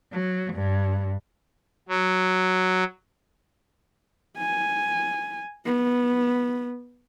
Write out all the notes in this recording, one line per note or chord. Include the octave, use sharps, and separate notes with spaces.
F#3
G2
F#3
G#5
B3